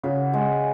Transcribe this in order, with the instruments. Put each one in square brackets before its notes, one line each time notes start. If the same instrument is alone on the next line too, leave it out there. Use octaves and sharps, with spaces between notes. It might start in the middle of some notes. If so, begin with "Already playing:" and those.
[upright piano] C#3 [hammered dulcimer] F#4
[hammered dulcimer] G#3